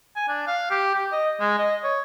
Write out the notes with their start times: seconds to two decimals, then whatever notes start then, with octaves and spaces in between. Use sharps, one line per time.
0.16 G#5
0.28 D4
0.47 F5
0.70 G4
0.94 G4
1.12 D#5
1.40 G#3
1.58 D#5
1.84 C#5